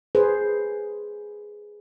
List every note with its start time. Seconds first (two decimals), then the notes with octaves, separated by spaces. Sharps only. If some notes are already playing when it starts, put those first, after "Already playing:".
0.15 G#4 B4 C5